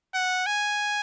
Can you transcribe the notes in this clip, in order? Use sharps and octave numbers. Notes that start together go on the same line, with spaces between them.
F#5
G#5